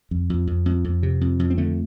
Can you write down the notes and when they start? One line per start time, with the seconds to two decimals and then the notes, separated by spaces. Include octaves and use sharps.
0.11 F2
0.30 F2
0.47 F2
0.66 F2
0.84 F2
1.03 C3
1.21 F2
1.39 F2
1.50 C4
1.58 D3 A3